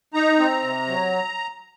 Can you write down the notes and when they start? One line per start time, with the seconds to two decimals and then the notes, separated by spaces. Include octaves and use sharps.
0.14 D#4 A#5
0.39 C4
0.63 C3
0.88 F#3